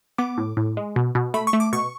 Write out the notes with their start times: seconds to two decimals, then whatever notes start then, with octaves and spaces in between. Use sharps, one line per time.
0.18 B3 D6
0.38 A2
0.57 A2
0.77 G#3
0.96 B2
1.15 B2
1.34 A3 B5
1.47 C#6
1.53 A3
1.60 D6
1.73 B2 C#6